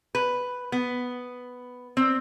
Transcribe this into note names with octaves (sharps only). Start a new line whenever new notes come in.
B4
B3
C4